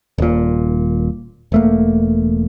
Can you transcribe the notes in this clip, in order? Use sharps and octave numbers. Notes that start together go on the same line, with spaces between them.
D#1 A#2
E1 A3 A#3